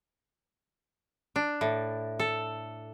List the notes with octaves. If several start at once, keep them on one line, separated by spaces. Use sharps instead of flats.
D4
A2
A4